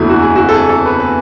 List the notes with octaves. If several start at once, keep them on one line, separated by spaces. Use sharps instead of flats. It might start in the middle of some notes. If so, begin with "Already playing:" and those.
Already playing: F#1 E2 D3 F#3 A3 E4
F#4
G#4
F#4
A4
G#4
A4
B4
B4